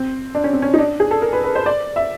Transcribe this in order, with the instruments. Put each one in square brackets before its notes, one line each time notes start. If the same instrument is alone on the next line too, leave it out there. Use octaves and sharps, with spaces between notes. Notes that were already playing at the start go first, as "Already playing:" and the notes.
Already playing: [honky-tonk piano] C4
D4
C#4
C4
C#4
D#4
D4
G#4
A4
A#4
B4
B4
C5
D5
E5